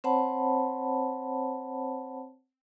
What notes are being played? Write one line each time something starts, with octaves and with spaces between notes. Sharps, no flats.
C4 C5 C#5 F#5 A5 B5